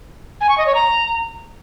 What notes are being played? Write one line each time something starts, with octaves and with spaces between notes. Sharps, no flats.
G#5
C#6
D#5
C#5
A#5